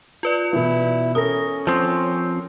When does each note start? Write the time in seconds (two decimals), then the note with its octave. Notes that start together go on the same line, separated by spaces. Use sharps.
0.23 F4 B4 D5
0.53 B2 E3 E4
1.15 C#4 A4 A#4 D#6 A#6
1.67 F3 C4 C6